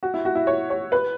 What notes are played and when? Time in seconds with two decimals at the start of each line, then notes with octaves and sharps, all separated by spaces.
0.03 F#4
0.14 E4
0.25 F#4
0.35 E4
0.47 C#5
0.70 C#5
0.92 B4